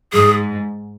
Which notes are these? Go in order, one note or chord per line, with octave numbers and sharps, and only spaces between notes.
G#2 G#4